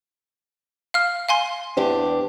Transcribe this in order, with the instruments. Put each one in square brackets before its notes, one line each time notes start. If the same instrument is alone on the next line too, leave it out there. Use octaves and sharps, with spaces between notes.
[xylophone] F5 F6
F5 G#5 C6
[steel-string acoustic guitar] E2 D4 G4